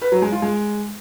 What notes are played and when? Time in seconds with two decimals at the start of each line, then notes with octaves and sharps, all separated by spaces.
0.02 B4
0.12 F#3
0.22 G#3
0.32 F4
0.42 G#3